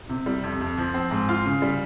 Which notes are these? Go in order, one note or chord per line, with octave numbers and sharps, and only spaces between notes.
C3
G3
F2
F2
F3
C4
G#2
F4
C#3
G3